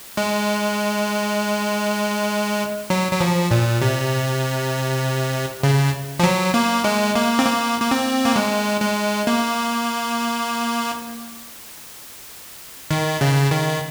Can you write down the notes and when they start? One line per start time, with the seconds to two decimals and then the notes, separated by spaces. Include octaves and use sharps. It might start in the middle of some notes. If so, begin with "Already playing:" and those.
0.17 G#3
2.90 F#3
3.12 F#3
3.21 F3
3.51 A#2
3.82 C3
5.63 C#3
6.20 F3
6.23 F#3
6.54 A#3
6.84 G#3
7.15 A#3
7.39 C4
7.46 A#3
7.80 A#3
7.91 C4
8.25 A#3
8.36 G#3
8.82 G#3
9.27 A#3
12.91 D#3
13.21 C#3
13.51 D#3